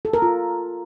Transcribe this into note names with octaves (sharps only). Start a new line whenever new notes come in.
A4
A#4
F4